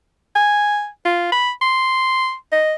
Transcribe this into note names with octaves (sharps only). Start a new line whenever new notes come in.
G#5
F4
B5
C6
D#5